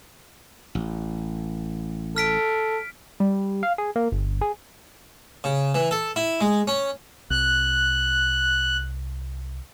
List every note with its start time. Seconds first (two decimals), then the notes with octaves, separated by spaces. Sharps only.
0.75 A1
2.16 A4 F6 B6 D7
3.20 G3
3.63 F5
3.78 G#4
3.96 A#3
4.12 G1
4.41 G#4
5.44 C#3
5.75 E3
5.91 A4
6.16 E4
6.41 G#3
6.67 C#4
7.30 C2 F#6